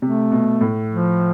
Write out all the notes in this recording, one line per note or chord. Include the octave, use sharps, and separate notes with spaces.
C3 A3
B2
A2
F3